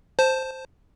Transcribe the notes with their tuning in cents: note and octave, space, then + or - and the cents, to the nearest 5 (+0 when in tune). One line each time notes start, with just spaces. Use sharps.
C5 +0 A5 +5